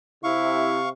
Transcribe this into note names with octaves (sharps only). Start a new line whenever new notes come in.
C3 E4 F5 C#6